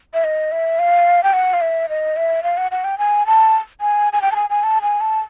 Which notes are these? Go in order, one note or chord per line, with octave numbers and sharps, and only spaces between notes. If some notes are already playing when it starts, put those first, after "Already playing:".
E5
D#5
E5
F5
G5
F#5
F5
E5
D#5
E5
F5
F#5
F#5
G5
G#5
A5
G#5
G#5
G5
A5
G#5
G#5
A5
G#5
A5